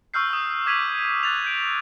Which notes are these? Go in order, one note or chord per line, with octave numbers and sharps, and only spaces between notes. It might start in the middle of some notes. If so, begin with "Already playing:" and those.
C#6 E6 F6 G6 C7
C#6 D#6
D6 G#6 B6 D#7 F7 F#7
F#6 A6 F7
G6 D7